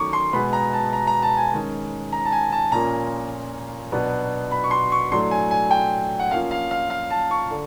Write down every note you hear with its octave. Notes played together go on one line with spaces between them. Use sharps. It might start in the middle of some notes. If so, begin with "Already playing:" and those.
Already playing: D#3 F#3 A3 C#4 C#6 D6
C6
B2 G#3 B3 B5
A#5
A5
A#5
A#5
A5
G#5
D#3 G#3 C#4
A#5
A5
G#5
A5
A#2 F3 A#3 C#4 A#5
B2 F#3 B3 D4
B5
C#6
C6
C#6
A2 F#3 A3 D4 C6
G#5
G#5
G5
F#5
F3 A#3 C#4 F5
F5
F5
F5
A5
C#6
D3